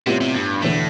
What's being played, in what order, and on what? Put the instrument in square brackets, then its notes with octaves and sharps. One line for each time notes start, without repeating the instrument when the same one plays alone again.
[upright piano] A2 G3 B3 F4 [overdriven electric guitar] C3
[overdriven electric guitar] C3
G2
[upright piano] E1 E2 D3 A3 [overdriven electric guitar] A2